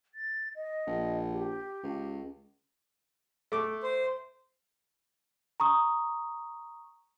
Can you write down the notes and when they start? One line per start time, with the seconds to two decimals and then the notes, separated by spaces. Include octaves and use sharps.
0.14 A6
0.55 D#5
0.87 A#1
1.31 G4
1.83 C#2
3.52 A3 D6
3.83 C5
5.60 A#5 C#6 D#6